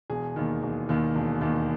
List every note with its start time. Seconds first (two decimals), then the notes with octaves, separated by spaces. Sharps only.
0.10 E1 G#4
0.36 D#2 D#3
0.63 E1
0.89 D#2 D#3
1.15 E1
1.41 D#2 D#3